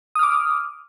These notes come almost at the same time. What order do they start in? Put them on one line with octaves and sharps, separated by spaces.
D#6 F6 D6